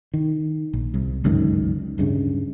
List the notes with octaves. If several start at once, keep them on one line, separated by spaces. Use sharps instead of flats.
D#3
A#1
C2
G1 C#2 F#2 D#3
D1 G2 C#3